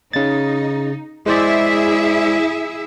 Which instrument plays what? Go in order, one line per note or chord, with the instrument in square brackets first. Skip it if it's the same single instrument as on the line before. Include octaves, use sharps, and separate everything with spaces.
[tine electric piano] C#3 A6 [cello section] D#4
[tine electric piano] G#3 C5 D5 [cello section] E4 G#4 E5